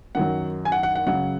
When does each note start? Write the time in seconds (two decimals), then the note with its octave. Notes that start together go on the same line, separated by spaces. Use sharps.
0.15 F#2 D#3 F#3 F#5
0.65 G#5
0.72 F#5
0.83 F#5
0.95 F#5
1.06 C#2 C#3 F#3 F#5